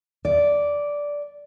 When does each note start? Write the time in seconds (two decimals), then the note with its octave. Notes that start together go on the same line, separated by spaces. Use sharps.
0.25 D5